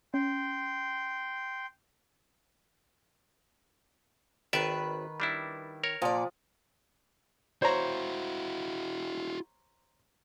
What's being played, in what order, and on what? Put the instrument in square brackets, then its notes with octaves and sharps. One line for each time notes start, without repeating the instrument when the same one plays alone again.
[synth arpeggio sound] C#4 [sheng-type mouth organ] G5 C6
[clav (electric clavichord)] G#1 D5 E5 [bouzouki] D#3 B4
[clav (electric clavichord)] G3 D4 E4
A#4 C#5
[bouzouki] A#2 D5 [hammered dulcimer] F3
[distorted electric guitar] E4 F#4 [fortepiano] C5 C#5 A#5